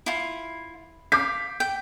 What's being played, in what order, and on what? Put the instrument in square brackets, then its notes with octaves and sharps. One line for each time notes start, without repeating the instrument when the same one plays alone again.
[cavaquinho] E4 F4
[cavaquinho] F5 [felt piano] D6 G6 B6
[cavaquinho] G5